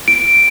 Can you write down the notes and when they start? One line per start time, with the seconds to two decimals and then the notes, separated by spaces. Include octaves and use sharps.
0.08 D7